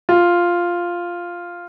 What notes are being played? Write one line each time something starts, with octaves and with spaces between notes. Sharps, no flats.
F4